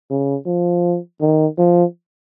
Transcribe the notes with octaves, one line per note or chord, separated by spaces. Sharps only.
C#3
F3
D#3
F3